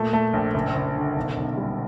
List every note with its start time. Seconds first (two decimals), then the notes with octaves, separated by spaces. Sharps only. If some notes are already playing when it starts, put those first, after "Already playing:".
Already playing: A#2 A3
0.13 A3
0.33 A#1
0.54 F#1
0.75 F#1
0.96 D3
1.16 B1
1.37 B1
1.57 G3